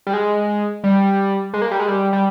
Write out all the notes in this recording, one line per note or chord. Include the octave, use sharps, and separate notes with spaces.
G3
G#3
G3
G#3
A#3
G3
G#3
G3
G3